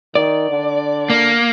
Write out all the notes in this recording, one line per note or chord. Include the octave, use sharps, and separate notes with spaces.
D#3 D5
D3
A#3